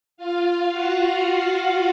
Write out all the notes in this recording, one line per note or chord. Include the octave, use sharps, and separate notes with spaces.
F4 F5
F#4 F#5